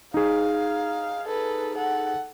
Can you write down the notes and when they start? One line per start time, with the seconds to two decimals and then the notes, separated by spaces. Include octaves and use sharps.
0.14 D#4 G#4 F5
1.27 A4 B4
1.75 A4 F#5